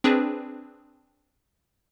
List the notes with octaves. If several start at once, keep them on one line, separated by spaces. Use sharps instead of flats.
C4 D4 G#4 B4